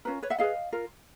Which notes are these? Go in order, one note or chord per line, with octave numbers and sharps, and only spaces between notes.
C#4 F4 A#4 B4
B4 C#5
E5 F#5
E4 G#4 B4 D#5 F5
F4 A#4